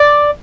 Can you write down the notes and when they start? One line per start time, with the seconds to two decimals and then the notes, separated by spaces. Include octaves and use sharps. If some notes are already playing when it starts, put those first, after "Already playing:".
Already playing: D5